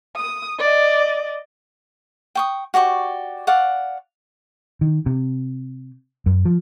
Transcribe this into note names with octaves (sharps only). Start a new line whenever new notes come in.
D#6
D5 D#5
G5 C#6 D#6
F#4 G4 D5 C#6
D5 F5 F#5 C#6
D#3
C3
F#2
F3